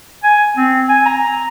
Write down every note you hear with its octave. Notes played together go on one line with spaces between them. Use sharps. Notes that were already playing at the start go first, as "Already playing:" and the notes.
G#5
C4
G#5
A#5